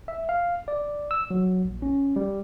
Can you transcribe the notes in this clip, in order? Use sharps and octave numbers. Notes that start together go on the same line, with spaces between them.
E5
F5
D5
E6
F#3
A#1
C#4
G3